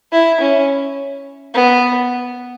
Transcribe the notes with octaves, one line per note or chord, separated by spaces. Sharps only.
E4
C#4
B3